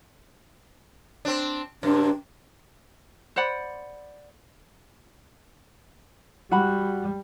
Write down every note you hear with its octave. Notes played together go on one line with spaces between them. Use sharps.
C4 D4
F#2 C3 D4
C5 D5 F#5 B5
G3 F#4 F#5 B5